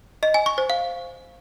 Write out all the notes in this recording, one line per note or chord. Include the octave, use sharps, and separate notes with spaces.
D#5
G#5
C#6
C5
F5